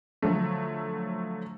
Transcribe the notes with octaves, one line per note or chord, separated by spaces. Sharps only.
D3 F3 F#3 A3